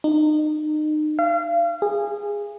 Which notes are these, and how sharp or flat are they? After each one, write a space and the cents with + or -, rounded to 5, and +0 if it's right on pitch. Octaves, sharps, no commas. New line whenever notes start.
D#4 -30
F5 -35
G#4 -20